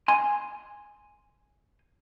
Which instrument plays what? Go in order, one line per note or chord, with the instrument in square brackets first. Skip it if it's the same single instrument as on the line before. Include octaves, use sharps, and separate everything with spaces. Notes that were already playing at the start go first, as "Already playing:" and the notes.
[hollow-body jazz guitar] G#5 C6